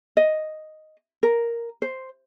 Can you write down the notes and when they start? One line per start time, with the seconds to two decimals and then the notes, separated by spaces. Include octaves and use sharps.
0.17 D#5
1.23 A#4
1.82 C5